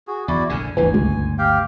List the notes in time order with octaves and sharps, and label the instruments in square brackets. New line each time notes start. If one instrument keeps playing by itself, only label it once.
[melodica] F#4 G#4
[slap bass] E2 [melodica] E4 F#4 D5
[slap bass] A#1 F#2 D3 [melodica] G#5
[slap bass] G1 D2 [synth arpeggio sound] E3
[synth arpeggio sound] C#2
[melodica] G4 F5 G5